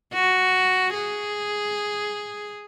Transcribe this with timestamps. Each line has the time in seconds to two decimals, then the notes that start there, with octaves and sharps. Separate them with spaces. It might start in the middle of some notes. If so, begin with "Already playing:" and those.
0.13 F#4
0.94 G#4